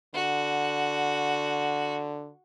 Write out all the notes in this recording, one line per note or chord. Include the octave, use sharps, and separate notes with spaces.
D3 F#4